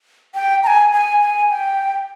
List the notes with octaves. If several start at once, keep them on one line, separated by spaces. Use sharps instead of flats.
G5
A#5
G#5
G#5
G#5
G5